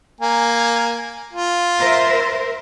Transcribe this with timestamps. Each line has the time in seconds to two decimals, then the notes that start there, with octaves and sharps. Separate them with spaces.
0.21 A#3 G#5
1.33 F4
1.79 A#4 C5 E5